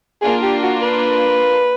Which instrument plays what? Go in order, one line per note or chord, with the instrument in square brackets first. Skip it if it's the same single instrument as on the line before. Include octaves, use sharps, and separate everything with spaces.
[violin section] A#3 D4 F4 [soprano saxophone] G#4
[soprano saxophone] G4
F#4
B4